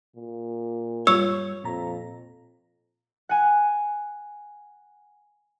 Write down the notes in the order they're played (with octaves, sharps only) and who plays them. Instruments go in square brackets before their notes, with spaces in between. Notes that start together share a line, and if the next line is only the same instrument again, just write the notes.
[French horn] A#2
[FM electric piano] G2 G3 F4 [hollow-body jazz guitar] C#5 [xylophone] E6
[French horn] F2 [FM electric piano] A#2 A#5
[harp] F#5 G#5